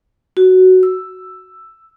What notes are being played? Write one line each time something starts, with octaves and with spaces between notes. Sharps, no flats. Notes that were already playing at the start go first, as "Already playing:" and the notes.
F#4
E6